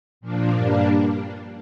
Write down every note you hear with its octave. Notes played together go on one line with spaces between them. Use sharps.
A#2 F3 A#3 D4
G2 G3 A#3 D4